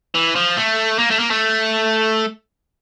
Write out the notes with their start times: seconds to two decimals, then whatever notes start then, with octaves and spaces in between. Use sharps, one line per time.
0.14 E3
0.35 F3
0.57 A3
0.99 A#3
1.11 A3
1.19 A#3
1.31 A3